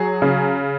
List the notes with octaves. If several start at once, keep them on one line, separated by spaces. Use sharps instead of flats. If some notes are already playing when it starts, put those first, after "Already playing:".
Already playing: F#3 G#4
C#3